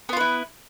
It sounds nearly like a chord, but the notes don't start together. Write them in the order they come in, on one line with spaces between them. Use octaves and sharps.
B3 F4 B4 E4